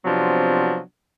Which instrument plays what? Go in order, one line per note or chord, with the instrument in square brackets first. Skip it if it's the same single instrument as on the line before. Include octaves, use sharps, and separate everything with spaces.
[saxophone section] C3 F3 F#3 B3 C4 D4